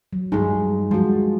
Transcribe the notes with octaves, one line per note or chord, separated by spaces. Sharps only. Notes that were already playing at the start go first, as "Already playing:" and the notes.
F#3
G2 G#3 D#4 G#4
F3 G#3 F#4